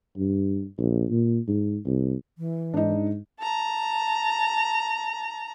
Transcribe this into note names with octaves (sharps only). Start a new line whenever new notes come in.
G2
A#1
A#2
G#2
C2
E3
G#2 D4 D#4
A5 A#5